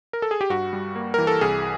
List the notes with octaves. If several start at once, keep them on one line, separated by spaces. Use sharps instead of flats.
A#4
A4
G#4
G4
G2 F#4
G3
A#3
E3 A#4
A4
C2 G#4